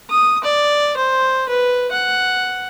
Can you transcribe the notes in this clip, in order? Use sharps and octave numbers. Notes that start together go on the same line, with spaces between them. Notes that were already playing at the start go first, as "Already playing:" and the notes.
D#6
D5
C5
B4
F#5